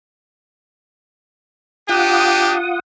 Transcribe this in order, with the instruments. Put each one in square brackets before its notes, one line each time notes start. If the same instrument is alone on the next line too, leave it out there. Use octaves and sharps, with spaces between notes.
[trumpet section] D4 G4 [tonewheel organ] F4 F#5 D#6